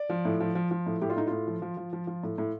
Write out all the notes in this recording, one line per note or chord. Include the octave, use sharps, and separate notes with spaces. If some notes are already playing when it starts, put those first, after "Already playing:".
Already playing: D5
F3
A2
F3
F3
F3
A2
A2 G4
F4
A2 D#4
A2 F4
F3
F3
F3
F3
F3
A2
A2